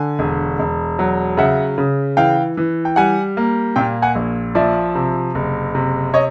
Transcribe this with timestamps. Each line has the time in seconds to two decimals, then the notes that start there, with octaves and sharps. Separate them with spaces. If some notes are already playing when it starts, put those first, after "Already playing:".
Already playing: D3 G#5
0.19 E1
0.59 E1
0.99 F#3
1.37 C#3 E5 F#5
1.78 C#3
2.17 E3 F5 G5
2.57 E3
2.85 G5
2.96 G3 F#5 G#5
3.37 A#3
3.76 A#2 F5 G5
4.02 F#5 G#5
4.15 A#1
4.55 F3 D5 E5
4.95 C3
5.35 F#1
5.75 C3
6.14 C#5 D#5